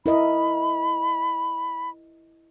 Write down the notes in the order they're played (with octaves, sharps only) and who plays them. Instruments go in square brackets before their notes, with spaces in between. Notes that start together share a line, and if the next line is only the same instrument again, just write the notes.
[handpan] E4 A#4 D#5 [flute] B5